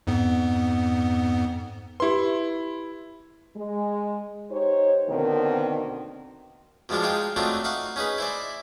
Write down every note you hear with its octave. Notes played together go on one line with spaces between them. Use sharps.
F2 G#2 B3
E4 G4 B4 C6
G#3
D#4 G4 C5 C#5
B2 D3 D#3 A#3 C4
B2 F3 G#3 D4 F4
G#3 D#4 F4 G5
F#3 A3 C4 D4 D#4 F4
D#4 F5 F#5 C#6
C#4 D#4 G#4 B4
E4 C5 D5